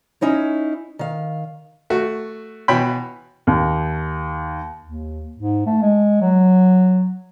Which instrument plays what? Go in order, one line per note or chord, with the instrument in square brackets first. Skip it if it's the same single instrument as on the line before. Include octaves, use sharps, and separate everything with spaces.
[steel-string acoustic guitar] C#4 D#4 E4 C#5
D#3 F5
[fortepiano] A3 F#4
B2 E3 C#5 G5 B5
[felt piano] D#2
[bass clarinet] D#2
G#2
A3
G#3
F#3